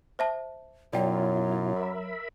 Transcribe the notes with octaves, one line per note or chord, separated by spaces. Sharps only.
C5 E5 A5
F#2 B2 F#3 E4 F4 D5 G5
A#4 E5 B5